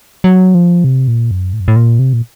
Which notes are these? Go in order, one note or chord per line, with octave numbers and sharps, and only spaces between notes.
F#3
F3
C3
A#2
F#2
A2
F#2
A2
A#2
C3
A#2